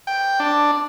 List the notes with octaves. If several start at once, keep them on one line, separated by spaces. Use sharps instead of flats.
G5
D4